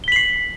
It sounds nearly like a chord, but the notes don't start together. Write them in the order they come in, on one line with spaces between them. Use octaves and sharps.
G7 B6 F#7 C7